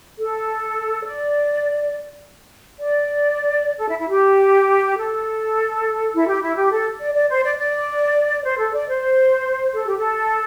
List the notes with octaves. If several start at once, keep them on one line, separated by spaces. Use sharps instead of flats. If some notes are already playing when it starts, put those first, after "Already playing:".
A4
D5
D5
A4
E4
E4
G4
A4
E4
G4
E4
G4
A4
D5
D5
C5
D5
D5
C5
A4
D5
C5
A4
G4
A4